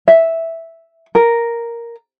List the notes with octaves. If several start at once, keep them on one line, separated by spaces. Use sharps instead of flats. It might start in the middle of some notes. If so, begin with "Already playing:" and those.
E5
A#4